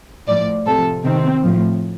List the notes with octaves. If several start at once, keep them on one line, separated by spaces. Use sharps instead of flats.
A2 F3 D5
C3 F3 A4
C3 D#3 C4
A2 F3